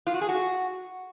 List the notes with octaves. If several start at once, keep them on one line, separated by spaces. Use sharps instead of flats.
F4
F#4
G#4
F#4